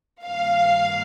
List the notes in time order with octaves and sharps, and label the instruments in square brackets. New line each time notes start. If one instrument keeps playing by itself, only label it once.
[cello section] G2 D#3 A#3 [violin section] F5